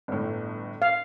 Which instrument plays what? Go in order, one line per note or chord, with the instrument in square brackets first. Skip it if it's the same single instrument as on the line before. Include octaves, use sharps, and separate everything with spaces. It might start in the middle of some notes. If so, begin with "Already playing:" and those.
[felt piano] G1 A2
[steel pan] F5